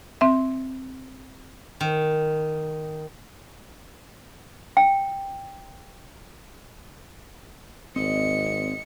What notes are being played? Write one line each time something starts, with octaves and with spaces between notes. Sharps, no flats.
C4 E5
D#3
G5
G#1 C4 D5 D#5 C#7